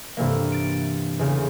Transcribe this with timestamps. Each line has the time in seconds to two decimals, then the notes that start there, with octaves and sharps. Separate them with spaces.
0.17 G2 C3 E3 A#3
0.52 A6 D7
1.19 E2 C#3